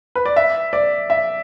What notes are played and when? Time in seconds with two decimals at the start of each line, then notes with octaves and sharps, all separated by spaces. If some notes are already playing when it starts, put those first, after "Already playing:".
0.15 B4
0.26 D5
0.36 E5
0.73 D5
1.10 E5